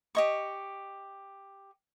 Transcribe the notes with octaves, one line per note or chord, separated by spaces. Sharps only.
G4 D#5 C#6